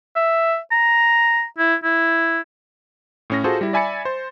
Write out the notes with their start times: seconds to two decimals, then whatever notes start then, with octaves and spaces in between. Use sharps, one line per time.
0.16 E5
0.72 A#5
1.58 E4
1.84 E4
3.30 A2 C#4 A#6
3.44 F4 F#4 G#4 A4 C5
3.61 G3 E4
3.73 D5 E5 G#5 B5 A6 C#7
4.05 C5